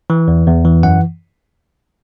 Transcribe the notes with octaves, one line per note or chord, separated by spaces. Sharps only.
E3
E2
E2
E3
F#2 F#5